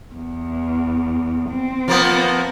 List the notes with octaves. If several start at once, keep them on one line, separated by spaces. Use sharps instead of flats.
E2
C4
F3 A#3 B3